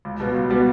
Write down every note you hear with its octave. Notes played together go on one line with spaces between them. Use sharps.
C#2
B2 G3 B3
C#2
B2 G3 B3